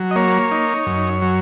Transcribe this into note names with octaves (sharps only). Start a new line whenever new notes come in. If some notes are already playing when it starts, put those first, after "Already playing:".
Already playing: F#3
D#5
A#3 C#5
D#4
F#2
F#3